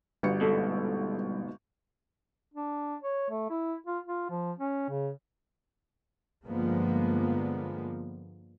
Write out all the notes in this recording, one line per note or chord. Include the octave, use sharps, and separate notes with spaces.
G1 G3 F#4 C#7
G#2 B2 A4
D4
C#5
A3
E4
F4
F4
F3
C#4
C#3
G2 D3 F3 G#3 A#3 B3